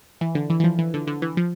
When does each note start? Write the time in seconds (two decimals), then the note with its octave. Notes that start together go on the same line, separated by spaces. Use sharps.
0.21 E3
0.35 D3
0.50 E3
0.60 E3
0.64 F3
0.78 E3
0.94 D3
1.07 D3
1.22 E3
1.37 F3